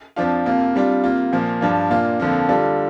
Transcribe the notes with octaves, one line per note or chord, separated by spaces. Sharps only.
F2 F3 D4 F4
F2 C3 A#3 F4
C3 G3 D4 F4
C3 A#3 F4
A#2 F3 A#3
G2 F3 D4 F4
A#2 A#3 D4 F4
F2 D3 F3 A#3
D3 G3 D4 F4